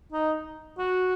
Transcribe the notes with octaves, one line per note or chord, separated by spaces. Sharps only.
D#4
F#4